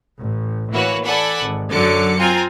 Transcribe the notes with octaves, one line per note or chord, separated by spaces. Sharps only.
A1
E3 A#3 E4 F#4 B4 C#5
A4 D5 F#5 G#5 B5
G#1
F#2 D3 F#3 D6 C#7
C4 F4 G#5 A#5